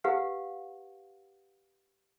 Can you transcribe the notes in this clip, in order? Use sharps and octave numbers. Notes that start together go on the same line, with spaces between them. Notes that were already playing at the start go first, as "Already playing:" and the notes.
G4 B4 F5 F#5